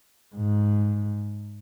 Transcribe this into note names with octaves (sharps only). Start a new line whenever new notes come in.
G#2